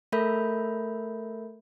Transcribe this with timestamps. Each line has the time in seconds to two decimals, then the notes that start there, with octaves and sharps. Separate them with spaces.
0.12 A3 A4 A#4 E5 B5 G6